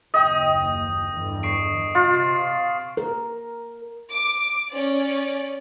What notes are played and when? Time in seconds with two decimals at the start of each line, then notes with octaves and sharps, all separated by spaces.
0.14 F#1 D#2 D#5 G5 D#6
1.10 E2 G2 D3
1.43 C#6 C7 D7
1.95 C3 F4
2.97 A#4
4.10 D6
4.69 C#4 D5